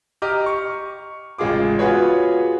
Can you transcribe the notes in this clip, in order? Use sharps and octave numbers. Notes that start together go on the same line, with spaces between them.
G4 D#5 A#5 D6 F6
C#6
A1 C#3 G#3 F4 G#4 D6
B3 F4 F#4 G#4 B4 C#5